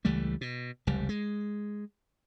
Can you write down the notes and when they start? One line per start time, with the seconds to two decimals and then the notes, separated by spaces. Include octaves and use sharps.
0.05 C#2 E3 G3 A3
0.41 B2
0.87 F1 C#2 G3
1.09 G#3